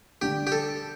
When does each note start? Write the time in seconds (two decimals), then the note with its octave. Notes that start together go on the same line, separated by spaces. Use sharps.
0.22 D3 G3 D4 G4
0.47 G4
0.52 A4